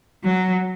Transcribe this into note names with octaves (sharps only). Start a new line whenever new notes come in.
F#3